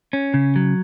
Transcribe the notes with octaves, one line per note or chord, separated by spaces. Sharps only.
C#4
C#3
F#3